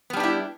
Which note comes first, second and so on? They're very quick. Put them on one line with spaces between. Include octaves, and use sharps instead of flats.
B3 G3 D4 G4 E4